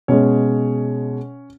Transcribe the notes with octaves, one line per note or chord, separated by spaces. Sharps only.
B2 G#3 C#4 C#5